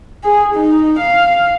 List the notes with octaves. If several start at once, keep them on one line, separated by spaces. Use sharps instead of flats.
G#4
D#4
F5